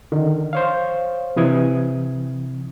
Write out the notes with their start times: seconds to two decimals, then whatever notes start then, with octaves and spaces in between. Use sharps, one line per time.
0.12 D3 D#3
0.53 C5 C#5 F5
1.36 C3 E3 D#6 G#6